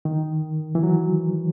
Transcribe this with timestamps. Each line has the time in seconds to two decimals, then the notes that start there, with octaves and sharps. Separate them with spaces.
0.05 D#3
0.75 E3
0.83 F#3